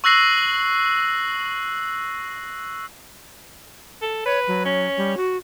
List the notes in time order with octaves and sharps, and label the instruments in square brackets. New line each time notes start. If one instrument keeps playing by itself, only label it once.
[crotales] C#6 E6 F#6 A#6 C7 F#7
[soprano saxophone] A4
[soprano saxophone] B4 [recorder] C#5
[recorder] F#3
[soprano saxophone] C#4
[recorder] G3
F#4